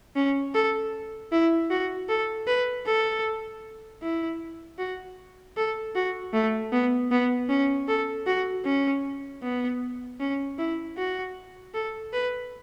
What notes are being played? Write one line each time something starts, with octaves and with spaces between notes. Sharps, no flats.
C#4
A4
E4
F#4
A4
B4
A4
E4
F#4
A4
F#4
A3
B3
B3
C#4
A4
F#4
C#4
B3
C#4
E4
F#4
A4
B4